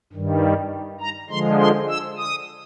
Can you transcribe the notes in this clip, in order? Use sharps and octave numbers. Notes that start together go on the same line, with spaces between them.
G2 D#3 G3
A#5
D3 F3 G#3 C6
C6
E6
D#6